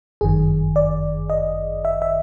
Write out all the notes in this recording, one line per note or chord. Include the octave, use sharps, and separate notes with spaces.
G1 F#2 D#3 G#4
D5
D#5
E5
E5